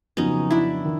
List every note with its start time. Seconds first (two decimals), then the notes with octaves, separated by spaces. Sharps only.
0.17 F2 C#3 F#3 B3 C#4 D#4
0.51 D4 E4
0.85 D#3